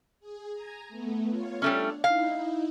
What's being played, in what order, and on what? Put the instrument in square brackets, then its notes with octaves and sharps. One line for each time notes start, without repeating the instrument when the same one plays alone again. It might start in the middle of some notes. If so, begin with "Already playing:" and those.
[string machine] G#4
G#5 A#5
A3 B3
F4 C#5
[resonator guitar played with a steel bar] G3 A3 C#4 [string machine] D4
[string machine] D#4 E4 [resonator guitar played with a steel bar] F5